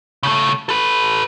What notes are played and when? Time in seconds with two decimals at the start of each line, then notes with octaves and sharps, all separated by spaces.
0.23 C#3 A3
0.69 A4 B4